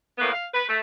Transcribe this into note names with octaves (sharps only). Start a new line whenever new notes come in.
A2 A#3 B3 B4
F5
B4
A3